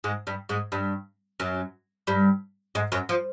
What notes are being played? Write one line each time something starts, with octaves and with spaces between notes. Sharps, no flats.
G#2 G#3
G2 G3
G#2 G#3
G2 G3
F#2 F#3
G2 G3
G#2 G#3
F#2 F#3
F3